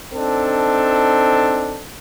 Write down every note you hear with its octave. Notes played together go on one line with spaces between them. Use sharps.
C4 D4 D#4 A4